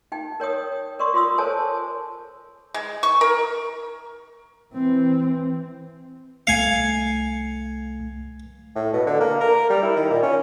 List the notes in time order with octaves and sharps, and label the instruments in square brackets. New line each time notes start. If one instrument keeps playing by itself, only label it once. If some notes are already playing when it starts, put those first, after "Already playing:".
[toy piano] D#4 G5
A#4 C#5 G5 D#6
A#4 D5 C6 C#6 D#6
F4 C6 D#6 E6
A4 A#4 C5 C#5 G#5 A5
[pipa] G#3
C#6
A#4
[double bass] E3 C4
[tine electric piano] C2 A3 C#7 [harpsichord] F5 G#5
[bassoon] A2
B2
D3
A#3
A#4
G3
E4
D#3
A#2
C#4